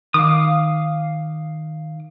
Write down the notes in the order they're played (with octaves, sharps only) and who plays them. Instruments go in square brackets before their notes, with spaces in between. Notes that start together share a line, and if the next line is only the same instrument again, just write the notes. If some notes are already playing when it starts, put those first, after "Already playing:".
[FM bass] D#3 [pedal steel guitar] F5 D6 D#6